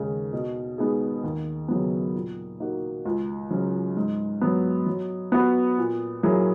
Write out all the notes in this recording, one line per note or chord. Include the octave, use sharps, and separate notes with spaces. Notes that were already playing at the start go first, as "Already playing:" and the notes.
Already playing: D#2 C#3 G#3
B2
G#3 B3 D#4 G#4
D#2
C#3 F#3 B3
A#2
A#3 D#4 F#4
C#2
C#3 F#3 C#4
G#2
F#3 B3
F#3
B3 F#4 B4
A#2
F#3 A#3 E4 G#4